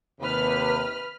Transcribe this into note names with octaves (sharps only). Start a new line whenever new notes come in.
D#2 C3 B4 B5 F6